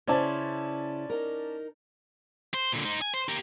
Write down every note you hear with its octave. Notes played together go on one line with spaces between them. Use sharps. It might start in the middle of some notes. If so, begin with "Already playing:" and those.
C#3 C#4 E4 C5 D5 A5
D#4 A#4
C5
A#2 D3
D#4 C5
G#5
C5
G4 A#4